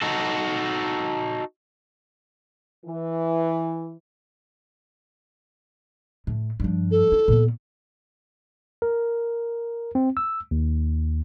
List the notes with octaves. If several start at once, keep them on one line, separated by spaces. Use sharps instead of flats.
D#4 F#4 A4
E3
A2
G2 F3
A4
E4
A#2 B3
A#4
C4
E6
D#2